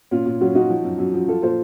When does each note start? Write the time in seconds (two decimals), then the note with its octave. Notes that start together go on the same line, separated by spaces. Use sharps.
0.11 A#2 C#4 F4
0.26 A#2
0.41 F#3 C#4 F4
0.55 F#3 D#4 F#4
0.70 F3
0.84 F#2
0.99 F#2
1.14 F3
1.28 F3 F4 A4
1.42 A#2 A4 C5